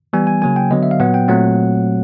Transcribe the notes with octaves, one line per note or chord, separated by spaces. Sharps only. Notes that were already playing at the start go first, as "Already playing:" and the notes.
E3 G3 B3 G#5
G#5
C#3 F#3 A#3 G#5
G5
D3 F#3 B3 D#5
E5
F5
A#2 F#3 B3 F#5
G5
A#2 F#3 A3 C4 F#5